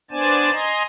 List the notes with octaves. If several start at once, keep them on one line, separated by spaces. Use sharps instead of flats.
B3 D4 C5 D5 G#5 A5
D#5 G#5 A#5 C6